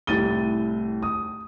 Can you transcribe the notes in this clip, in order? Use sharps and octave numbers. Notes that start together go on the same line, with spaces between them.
C2 A2 A6 D#7 G7
D#6